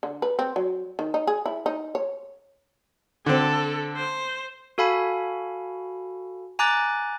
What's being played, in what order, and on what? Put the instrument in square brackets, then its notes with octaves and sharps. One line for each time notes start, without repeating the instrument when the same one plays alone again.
[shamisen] D3
B4
C4
F#3
D#3
D#4
G#4
E4
D#4
C#5
[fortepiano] D3 C4 [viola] A4
[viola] C5
[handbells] F#4 A4 F5 G#5 B5
G#5 A#5 D6 F#6 A6